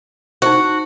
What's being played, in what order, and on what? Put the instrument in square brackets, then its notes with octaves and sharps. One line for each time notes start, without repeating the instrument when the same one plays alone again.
[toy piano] D#4 C5 [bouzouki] F#4